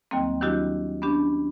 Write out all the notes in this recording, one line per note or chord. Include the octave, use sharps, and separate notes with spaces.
D#2 D#3 F#3 G3 A#3 C4
D#3 F#3 D4 E4 F#4 G4
B3 C#4 D4 G4